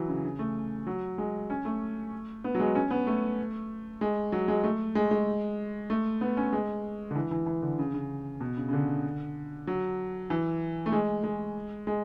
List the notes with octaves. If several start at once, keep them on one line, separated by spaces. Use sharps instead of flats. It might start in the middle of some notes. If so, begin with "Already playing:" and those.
Already playing: E3 F#3
C#3
C#3
A3
F#3
G#3
C#4
A3
B3
F#3
G#3
C#4
B3
A3
G#3
F#3
G#3
A3
G#3
G#3
A3
B3
C#4
G#3
D3
E3
E3
E3
D3
C#3
C#3
B2
C#3
C#3
D3
F#3
E3
A3
G#3
G#3
G#3